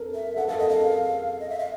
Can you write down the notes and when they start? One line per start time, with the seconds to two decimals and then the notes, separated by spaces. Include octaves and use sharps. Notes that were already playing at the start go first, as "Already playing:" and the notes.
Already playing: A4 A#4
0.15 E5
0.36 A4 F#5
0.48 A4 F5
0.59 A#4 D#5
0.69 A4 F5
0.81 G#4
1.40 D#5
1.50 E5
1.59 F5